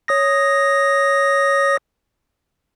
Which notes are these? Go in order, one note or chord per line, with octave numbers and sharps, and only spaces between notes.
C#5 D#6 A#6